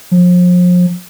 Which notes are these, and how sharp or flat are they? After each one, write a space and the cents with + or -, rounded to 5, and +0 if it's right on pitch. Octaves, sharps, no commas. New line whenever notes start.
F3 +35